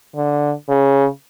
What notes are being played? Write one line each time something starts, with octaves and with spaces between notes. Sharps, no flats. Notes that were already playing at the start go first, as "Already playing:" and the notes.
D3
C#3